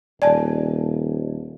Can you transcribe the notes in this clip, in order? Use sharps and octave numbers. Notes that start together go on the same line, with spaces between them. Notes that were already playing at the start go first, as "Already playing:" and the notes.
D#1 D5 G#5 A5